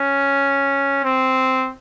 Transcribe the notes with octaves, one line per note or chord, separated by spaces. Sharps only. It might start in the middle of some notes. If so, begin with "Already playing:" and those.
Already playing: C#4
C4